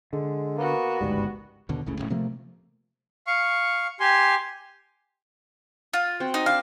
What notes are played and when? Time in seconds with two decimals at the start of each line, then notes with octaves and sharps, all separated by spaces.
0.13 D3 G#3
0.58 A#3 B3 F#4
1.01 G1 C#2 G#2 G3
1.69 D#2 B2 D3
1.86 F#1 C#2 A2 C#3
1.98 E1 B1 A2 C#3
2.10 C3 F3 A3 A#3
3.27 F5 C#6
4.00 G4 G#5 C6
5.94 F4
6.20 C4 F#4
6.34 D#4
6.46 D4 D5 F5